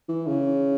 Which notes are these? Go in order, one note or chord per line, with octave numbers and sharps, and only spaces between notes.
E3
C#3